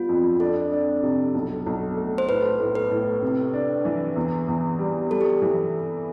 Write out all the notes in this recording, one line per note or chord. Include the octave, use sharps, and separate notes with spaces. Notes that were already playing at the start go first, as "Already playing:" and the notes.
Already playing: G3 B3 F4
F2
D4 A4
D4
C3
B1
B1
A3
C5
A2 B4
A2
B4
A2
C3
D4
E3
E2
E2
G3
G3 A4
G4
A4
E3